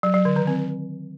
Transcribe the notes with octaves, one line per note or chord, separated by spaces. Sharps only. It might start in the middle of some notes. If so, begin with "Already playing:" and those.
F#3
F#3
D3
D#3
C4